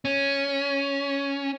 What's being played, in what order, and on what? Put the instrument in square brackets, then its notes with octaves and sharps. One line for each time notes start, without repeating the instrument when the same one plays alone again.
[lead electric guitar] C#4